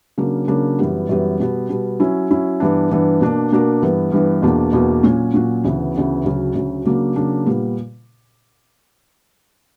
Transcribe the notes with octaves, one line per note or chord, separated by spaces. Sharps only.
C#3 F#3 A#3 D4 A#4
C#3 F#3 A#3 D4 A#4
F#2 E3 G3 B3
F#2 E3 G3 B3
B2 G3 B3
B2 G3 B3
F#3 C#4 E4
F#3 C#4 E4
G2 E3 B3 D4
G2 E3 B3 D4
B2 A#3 D4 F#4 A#4
B2 A#3 D4 F#4 A#4
G2 E3 B3
G2 E3 B3
E2 B2 A#3 D4
E2 B2 A#3 D4
A#2 F#3 C#4 F#4
A#2 F#3 C#4 F#4
D2 C#3 E3 B3
D2 C#3 E3 B3
D2 C#3 F#3
D2 C#3 F#3
C#3 F#3 A#3 D4
C#3 F#3 A#3 D4
A#2 G3 B3